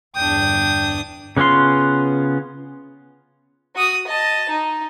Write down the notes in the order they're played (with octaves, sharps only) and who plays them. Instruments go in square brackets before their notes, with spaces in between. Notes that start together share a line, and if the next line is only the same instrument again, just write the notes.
[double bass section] G1 E2 [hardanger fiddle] D4 D#6 [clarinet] G5
[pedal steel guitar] C#3 B3 C#4 F4 C6
[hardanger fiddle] F#4 D#6
D#5 A5
D#4